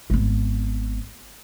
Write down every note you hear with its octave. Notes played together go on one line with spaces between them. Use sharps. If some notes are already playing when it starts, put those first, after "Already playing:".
G#1 B3